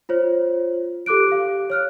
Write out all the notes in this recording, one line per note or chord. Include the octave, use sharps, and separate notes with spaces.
F4 C5 C#5
G4 A4 D6 F#6 D7
G4 F5
C#5 F6 F#6